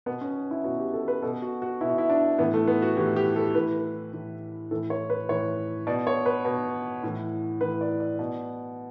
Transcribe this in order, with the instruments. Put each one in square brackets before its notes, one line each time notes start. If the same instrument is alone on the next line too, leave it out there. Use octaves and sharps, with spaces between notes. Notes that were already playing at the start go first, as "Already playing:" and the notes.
[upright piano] B2 B3
C#4
E4
B2 F#4
G4
A4
B4
B2 A4
F#4
F#4
B2 E4
F#4
E4
D4
A2 E3 B3
A3
B3
F#4
A2 E3 G4
G4
A4
A2 E3 B4
A2 E3
A2 E3 A4
C#5
B4
A2 E3 C#5
B2 D5
C#5
B4
B2
A2 E3
A2 E3 B4
D5
D5
B2